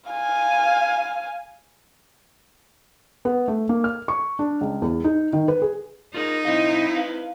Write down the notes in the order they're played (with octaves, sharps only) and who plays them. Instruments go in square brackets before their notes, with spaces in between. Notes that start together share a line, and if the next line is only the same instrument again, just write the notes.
[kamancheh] F5 G#5
[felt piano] B3
A3
A#3
F6
C#6
D4
C#2
E2
D#4
D#3
B4
G#4
[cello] D#4 [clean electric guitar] F4 G#4 A#4
[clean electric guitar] B1 D#5 F5 [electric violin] C4 E4
[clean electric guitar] B4 F5